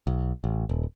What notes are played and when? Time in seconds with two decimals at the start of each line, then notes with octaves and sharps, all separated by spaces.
0.07 B1
0.44 A1
0.69 D#1